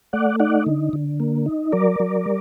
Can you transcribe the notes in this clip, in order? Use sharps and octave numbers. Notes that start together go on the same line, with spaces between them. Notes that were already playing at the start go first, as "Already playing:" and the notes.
A3 D5 F#5
D#4 D5 F#5
D3
D3
A#3
D#4
F#3 A#4 D5
F#3
G3